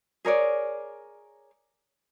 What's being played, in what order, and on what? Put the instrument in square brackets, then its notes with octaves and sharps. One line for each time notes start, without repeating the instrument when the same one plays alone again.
[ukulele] G#4 A#4 C#5 D5